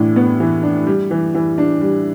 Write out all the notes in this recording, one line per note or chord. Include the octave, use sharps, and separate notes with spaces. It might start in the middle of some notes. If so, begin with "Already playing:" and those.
Already playing: A2 E3 D4
B3
E3
D4
G3
E3
E3
D4
G3